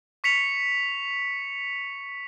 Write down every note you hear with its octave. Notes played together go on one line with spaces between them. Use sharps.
C#6 B6 C#7 F7